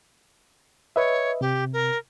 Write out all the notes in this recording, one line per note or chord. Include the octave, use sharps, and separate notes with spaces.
B4 C#5 D#5 E5
C3 G4
A#4